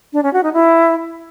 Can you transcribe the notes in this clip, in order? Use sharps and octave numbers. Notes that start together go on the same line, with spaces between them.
D4
C#4
F#4
D#4
E4